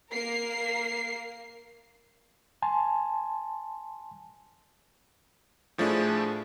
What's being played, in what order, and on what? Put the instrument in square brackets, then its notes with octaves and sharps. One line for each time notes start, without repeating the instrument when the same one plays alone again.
[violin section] A#3 A#4 C7
[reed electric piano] G#5 A5 C6
[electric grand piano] A2 F3 A3 D4 E4 G#4